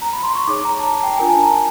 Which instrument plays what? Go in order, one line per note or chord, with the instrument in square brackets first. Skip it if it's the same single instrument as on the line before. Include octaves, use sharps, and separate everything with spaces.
[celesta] A#5
B5
C6
C#6
D#4 G#4 C#5 D6
A#5
A5
A#5
G5
D4 F4 A#4 G#5
A5
A#5